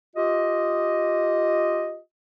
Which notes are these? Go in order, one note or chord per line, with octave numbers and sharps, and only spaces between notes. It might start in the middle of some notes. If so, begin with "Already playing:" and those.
F4 G4 D#5